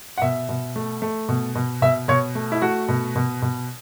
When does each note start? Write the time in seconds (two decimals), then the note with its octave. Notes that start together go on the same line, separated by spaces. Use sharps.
0.18 F#5
0.22 B2 E5
0.49 B2
0.76 A3
1.02 A3
1.29 B2
1.55 B2
1.82 B2 E5
2.08 B2 C#5
2.35 A3
2.52 E4
2.62 A3 F#4
2.89 B2
3.16 B2
3.42 B2